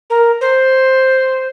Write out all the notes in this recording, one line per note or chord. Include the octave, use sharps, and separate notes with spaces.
A#4
C5